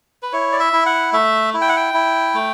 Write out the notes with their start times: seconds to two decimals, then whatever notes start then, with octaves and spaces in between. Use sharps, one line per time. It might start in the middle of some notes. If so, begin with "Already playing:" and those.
0.22 B4
0.32 E4 C#5
0.52 D5
0.60 E5
0.73 E4
0.86 F#5
1.13 A3 E5
1.54 E4
1.61 G5
1.69 F#5
1.76 G5
1.94 E4
2.34 A3